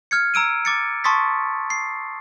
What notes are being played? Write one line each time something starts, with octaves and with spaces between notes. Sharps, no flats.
F6 G#6 C#7
A#5 E6 D7 D#7
D6 A6 C#7
A5 C6 C#6 D#6 A6 B6
C7